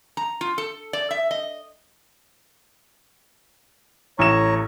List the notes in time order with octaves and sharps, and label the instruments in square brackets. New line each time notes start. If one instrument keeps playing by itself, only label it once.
[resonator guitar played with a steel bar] A#5
F4
A4
D5
E5
D#5
[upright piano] A1 E7 [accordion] C#5 A#5 C#6